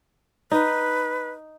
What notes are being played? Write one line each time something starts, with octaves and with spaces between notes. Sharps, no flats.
D#4 B4